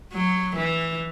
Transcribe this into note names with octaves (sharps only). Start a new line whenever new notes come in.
F#3
E3